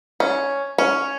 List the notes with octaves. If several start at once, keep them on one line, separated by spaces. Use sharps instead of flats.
C#4
C#4